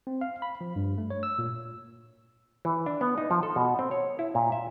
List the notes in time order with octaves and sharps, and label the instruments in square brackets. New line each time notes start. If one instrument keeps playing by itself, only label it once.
[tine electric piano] C4
F5
B5
F3
G2
A3
C#5
E6
A#2
[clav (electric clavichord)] E3
D4
B3
D#4
F3
A4
B2
C4
C#5
E4
A#2
E5